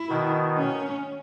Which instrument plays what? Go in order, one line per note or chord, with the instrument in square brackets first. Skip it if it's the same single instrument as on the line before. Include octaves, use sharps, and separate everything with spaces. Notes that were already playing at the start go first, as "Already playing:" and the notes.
Already playing: [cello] E4
[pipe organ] B2 D#3
[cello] C#4